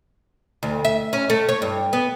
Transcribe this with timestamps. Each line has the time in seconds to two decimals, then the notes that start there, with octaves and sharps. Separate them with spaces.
0.63 D2
0.85 E5
1.13 C#4
1.30 A3
1.49 C#5
1.62 G2
1.93 B3